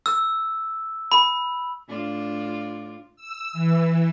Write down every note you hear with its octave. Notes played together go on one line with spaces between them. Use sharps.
E6
B5
A2 D4 F4
E6
E3